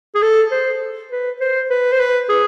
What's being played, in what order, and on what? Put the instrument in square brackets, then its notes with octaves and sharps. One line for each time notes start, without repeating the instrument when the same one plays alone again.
[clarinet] G#4
A4
C5
B4
C5
B4
C5
B4
G#4